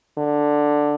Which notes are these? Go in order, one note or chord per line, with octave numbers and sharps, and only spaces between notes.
D3